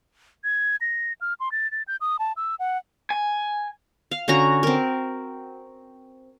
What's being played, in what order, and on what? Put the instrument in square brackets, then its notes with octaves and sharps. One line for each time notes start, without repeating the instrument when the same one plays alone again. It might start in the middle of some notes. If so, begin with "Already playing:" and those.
[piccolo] G#6
A#6
F6
C6
A6
A6
G6
D#6
A5
E6
F#5
[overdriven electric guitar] G#5
[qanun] F5
D3 C#4 F#4 A#5
C4 A#4